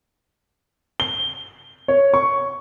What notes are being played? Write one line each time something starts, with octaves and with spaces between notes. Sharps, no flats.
G7
C#5
C#6